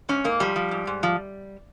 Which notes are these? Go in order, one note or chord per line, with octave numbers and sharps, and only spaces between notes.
G#2 C#4
G#2 A#3
F3 G3
F3
G#2
G#2
F3